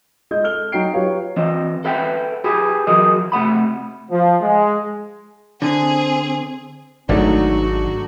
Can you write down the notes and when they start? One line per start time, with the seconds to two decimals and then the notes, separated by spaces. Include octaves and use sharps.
0.31 G#3 D#5 G6
0.43 A4 F6 G7
0.72 F#3 D#4 F#4 G5 C7 D7
0.93 F#3 F4 G4 B4 C#5 F5
1.37 E3 C4 D#5
1.85 A4 B4 E5 F#5 G5
2.44 G4 G#4 B4
2.87 E3 F#3 G#4 A#4 D#5
3.32 C3 A3 F#5 B5
4.11 F3
4.42 G#3
5.62 D3 C4 G#4
7.09 G#1 G#2 F#3 A3 D4 D#4 F#4